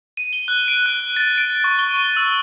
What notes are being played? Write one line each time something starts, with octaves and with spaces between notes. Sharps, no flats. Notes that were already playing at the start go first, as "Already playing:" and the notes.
D#7
G7
F#6
D7
F#6
A6
D7
C#6
G7
D#7
E6